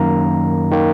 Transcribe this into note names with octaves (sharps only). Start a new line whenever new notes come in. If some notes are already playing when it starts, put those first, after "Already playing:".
Already playing: F#2 D#3 A#3 A#5
D#3 A#3